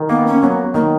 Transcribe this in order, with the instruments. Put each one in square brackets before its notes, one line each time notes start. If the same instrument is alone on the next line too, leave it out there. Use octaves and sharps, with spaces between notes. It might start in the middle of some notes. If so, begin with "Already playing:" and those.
Already playing: [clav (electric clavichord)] D#3
[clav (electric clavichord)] A#3 [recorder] B3
[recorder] C#4
[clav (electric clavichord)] F#3 [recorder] B3
[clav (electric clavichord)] D#3 [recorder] A#3